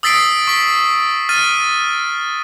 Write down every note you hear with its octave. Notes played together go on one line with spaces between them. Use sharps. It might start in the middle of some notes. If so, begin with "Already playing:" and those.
D#6 E6 A6 B6 C7 D7
C#6 B6
F6 A6 D#7